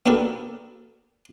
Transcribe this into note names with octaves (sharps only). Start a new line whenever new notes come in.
B3 D4 F#4 G4 A4 A#4